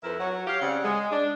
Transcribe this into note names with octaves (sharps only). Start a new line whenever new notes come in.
F2 E4 A#4 B4 E5
F#3 F#4
G4 C#5 F5
C#3 G3 C4 F#5
G#3
D4